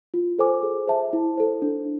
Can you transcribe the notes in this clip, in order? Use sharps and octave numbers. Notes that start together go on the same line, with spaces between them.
F4
A4 C5 G#5 D6
G#4
C5 E5 A5
E4
A4 C5
D4